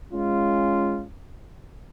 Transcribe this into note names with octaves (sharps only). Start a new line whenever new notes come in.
G#3 C#4 F4